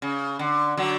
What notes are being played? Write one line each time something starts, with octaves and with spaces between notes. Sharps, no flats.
C#3
D3
D3 F#3